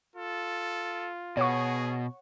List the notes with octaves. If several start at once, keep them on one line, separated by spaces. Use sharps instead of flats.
F4 A4
B2 G#4 C#5 F#5 C#6